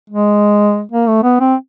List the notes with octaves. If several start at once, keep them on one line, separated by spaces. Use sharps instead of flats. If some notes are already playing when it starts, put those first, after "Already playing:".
G#3
A#3
A3
B3
C4